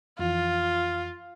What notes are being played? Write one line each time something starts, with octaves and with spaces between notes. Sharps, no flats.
F2 E3 F4